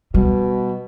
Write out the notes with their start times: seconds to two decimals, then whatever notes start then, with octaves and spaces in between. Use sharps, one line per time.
0.14 B2 G3